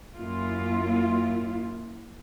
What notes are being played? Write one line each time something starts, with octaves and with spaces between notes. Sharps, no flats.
F#2 A#3 E4 F4